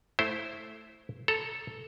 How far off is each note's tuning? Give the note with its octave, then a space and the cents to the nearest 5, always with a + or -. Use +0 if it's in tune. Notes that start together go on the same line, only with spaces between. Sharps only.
A3 +0 E4 -5 C5 +0
A4 +0 A#5 +0